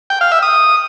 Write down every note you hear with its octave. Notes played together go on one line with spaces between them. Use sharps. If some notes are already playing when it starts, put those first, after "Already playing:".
G5
F5
E5
D#6